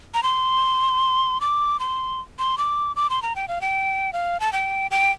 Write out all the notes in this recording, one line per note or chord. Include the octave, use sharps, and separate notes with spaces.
A#5
C6
D6
C6
C6
D6
D6
C6
A#5
G5
F5
G5
F5
A5
G5
G5